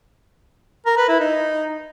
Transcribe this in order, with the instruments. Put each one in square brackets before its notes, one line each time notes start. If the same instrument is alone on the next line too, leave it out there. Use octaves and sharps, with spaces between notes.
[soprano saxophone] A#4
B4
E4
D#4